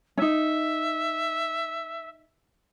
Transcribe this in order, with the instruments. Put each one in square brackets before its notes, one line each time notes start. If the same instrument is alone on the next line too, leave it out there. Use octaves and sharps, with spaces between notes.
[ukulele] C#4 D#4 [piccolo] E5